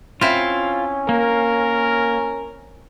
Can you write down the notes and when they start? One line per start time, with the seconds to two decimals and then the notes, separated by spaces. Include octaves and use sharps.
0.21 C4 C#4 E4 F4
1.09 A#3 A#4